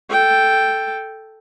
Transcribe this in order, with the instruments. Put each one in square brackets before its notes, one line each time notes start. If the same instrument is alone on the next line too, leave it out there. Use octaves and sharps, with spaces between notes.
[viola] A4 G5